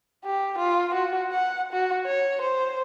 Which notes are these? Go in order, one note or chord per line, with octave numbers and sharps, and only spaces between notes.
G4
F4
F#4
F#5
F#4
C#5
C5